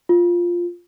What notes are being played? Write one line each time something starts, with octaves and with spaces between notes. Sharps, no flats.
F4